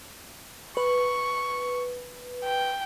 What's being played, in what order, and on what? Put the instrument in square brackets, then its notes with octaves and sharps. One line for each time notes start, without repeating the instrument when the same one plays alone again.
[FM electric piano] B4 [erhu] C#6
[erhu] G5